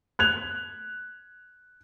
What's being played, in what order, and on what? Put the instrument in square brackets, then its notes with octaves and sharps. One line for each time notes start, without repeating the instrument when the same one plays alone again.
[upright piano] F#6 G#6 F7